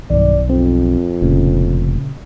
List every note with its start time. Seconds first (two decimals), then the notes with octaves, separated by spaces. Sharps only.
0.10 B1 G2 D#3 D5
0.50 F2 C4
1.21 F1 A#2 C#3